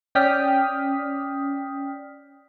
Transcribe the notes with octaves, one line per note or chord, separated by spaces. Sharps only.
C#4 D5 G5 D#6 F6 B6